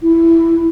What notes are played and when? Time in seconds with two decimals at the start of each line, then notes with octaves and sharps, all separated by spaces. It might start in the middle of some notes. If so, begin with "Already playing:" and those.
0.02 E4